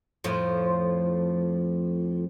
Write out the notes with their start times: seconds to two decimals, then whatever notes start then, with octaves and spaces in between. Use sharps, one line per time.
0.24 F2 A2 F3